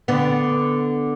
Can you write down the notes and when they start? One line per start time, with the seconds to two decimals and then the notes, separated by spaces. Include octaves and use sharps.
0.08 D3 B3